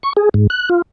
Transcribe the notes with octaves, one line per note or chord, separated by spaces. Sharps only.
C#6
G#4
G#2
F#6
F4